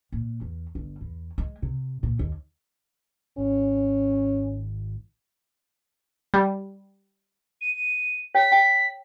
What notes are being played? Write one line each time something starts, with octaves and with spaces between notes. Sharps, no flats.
A#2
E2
G1
E2
G#3
C3
A#2
D#2
G#1 C#4
G3
D#7
C#5 G5 B6
G5